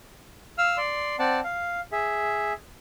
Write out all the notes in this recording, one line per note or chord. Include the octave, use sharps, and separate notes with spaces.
F5 E6 F6
D5 C6
C4 D5 F#5 A5
F5
G#4 E5